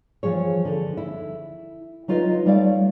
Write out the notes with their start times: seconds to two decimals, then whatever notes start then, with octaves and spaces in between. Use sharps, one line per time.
0.23 E3 F3 G#4 C#5
0.65 D3
0.97 E4
2.08 F#3 D#4 F4 B4 C5 D#5
2.46 G3 A3 C#5 D5 F5